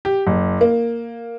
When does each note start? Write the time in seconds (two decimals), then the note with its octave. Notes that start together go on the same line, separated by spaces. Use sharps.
0.05 G4
0.27 F#1
0.61 A#3